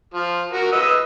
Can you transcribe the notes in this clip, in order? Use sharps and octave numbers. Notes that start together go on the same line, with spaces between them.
F3
F#4 A#4
B4 D#5 E6